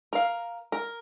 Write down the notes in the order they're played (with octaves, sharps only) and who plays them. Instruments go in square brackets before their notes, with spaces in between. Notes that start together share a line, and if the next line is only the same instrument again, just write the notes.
[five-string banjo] A#4 F5
A#4